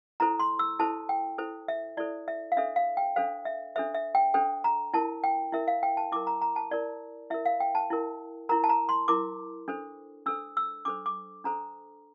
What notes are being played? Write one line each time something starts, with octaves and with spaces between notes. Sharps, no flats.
E4 A4 C5 A#5
C6
E6
E4 A4 C5 A5
G5
E4 A4 C5
E5
E4 A4 C5 D5
E5
F5
D4 A4 C5 E5
F5
G5
D4 A4 C5 F5
E5
D4 A4 C5 E5
E5
G5
D4 A4 C5 G5
A#5
E4 A#4 A5
G5
E4 A#4 E5
F5
G5
A5
E4 A#4 D6
A#5
A#5
A5
E4 A#4 D5
E4 A#4 E5
F5
G5
A5
E4 A#4
E4 A#4 A#5
A5
A#5
C6
E4 A#4 D6
D4 A4 C5
D4 A4 C5 E6
E6
D4 A4 C5 D6
D6
D4 A4 C5 A#5